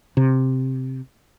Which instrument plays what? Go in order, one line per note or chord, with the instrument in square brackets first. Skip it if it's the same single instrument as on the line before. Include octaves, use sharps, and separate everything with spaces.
[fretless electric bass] C3